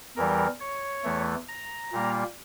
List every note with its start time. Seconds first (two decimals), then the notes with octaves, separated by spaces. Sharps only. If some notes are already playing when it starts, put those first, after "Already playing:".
0.16 E2 E3 G3 A#4
0.60 C#5
1.04 E2 E3 A3
1.48 A#5
1.92 A#2 G3 A#3